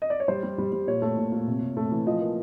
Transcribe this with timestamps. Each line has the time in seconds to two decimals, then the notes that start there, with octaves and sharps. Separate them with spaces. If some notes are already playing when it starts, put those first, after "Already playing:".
0.02 D#5
0.10 D5
0.20 C#5
0.28 G3 C5
0.43 G3
0.58 G3
0.72 G3
0.87 A#2 C#5
1.02 A3
1.17 A#2
1.32 A#2
1.47 C3
1.62 C3
1.77 A3
1.91 E3
2.06 F3 D#5
2.21 A#3